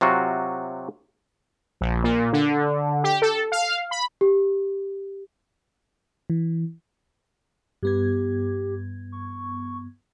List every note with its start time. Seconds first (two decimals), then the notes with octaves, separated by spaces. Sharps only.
0.01 C3 F#3 F4 F#4
1.81 A#1
2.04 A#2
2.33 D3
3.04 G4
3.22 A4
3.52 F5
3.91 B5
4.21 G4
6.30 E3
7.83 G2 B3 G4 G#6
9.12 C#6